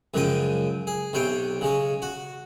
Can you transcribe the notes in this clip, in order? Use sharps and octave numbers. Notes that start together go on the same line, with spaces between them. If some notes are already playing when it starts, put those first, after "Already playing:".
C#2 F#2 C#3 F3 G5 D#6
G#4
B1 C3 C5 C#5 G5
C#3 G#3 C#5
F#4